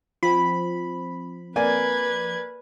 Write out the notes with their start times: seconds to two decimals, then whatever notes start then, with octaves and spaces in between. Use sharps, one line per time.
0.23 F3 C4 B5
1.56 A#3 B4 D5 G#5 G#6